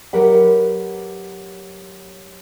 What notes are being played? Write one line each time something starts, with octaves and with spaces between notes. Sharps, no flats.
F#3 G4 A#4 B4 E5 F#5